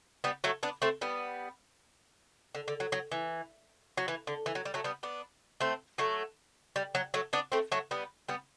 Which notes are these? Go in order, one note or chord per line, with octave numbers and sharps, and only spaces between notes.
G3 B3
F#3 A3
B3 D4
A3 C4
G3 B3
D3
D3
F#3
F#3
E3
F#3
E3
D3
E3
F#3
G3
F#3 A3
G3 B3
B3 D4
A3 C4
F#3 A3
G3
F#3
F#3 A3
B3 D4
A3 C4
F#3 A3
G3 B3
G3 B3